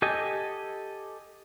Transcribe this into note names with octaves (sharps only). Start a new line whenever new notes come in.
G4 A4 D#5 G#5